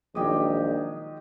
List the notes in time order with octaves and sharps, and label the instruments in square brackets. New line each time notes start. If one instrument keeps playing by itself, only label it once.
[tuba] A#1 [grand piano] D#3 F#3 G#3 [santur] G4 D#5